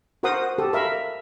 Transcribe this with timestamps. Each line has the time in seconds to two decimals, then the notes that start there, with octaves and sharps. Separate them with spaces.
0.23 F#4 A#4 C5 F#5 C6 D#6
0.58 G4 A4
0.73 A#4 E5 F5 B5